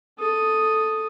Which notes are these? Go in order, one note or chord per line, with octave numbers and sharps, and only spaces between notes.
A4 D#6